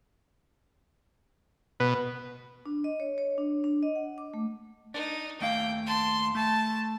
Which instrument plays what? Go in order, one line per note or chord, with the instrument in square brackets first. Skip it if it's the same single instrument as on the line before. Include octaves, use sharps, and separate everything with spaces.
[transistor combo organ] B2 [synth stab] B4
[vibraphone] D4
D#5
C#5
C#5
D4
D4
D#5
F#5
D6
A3
[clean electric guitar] D4 [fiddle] D#4
[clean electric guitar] D#2 A3 F5 [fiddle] G5
[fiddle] A5 C6
[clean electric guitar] A3 [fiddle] A5